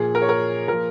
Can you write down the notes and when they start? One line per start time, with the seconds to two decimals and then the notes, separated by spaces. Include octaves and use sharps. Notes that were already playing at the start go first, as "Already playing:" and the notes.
Already playing: A#2 F3 G#4
0.15 A#4
0.22 C#5
0.29 A#4
0.68 A#2 F3 A#4